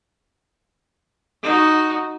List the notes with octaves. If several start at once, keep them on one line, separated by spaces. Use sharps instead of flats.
D#4 F#4